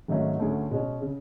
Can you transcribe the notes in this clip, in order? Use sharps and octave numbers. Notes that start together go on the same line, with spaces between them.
G#1 G#2 F#3 A3 C#4
D2 D3 A3 C#4 G#4
B2 G#3 C#4
C#3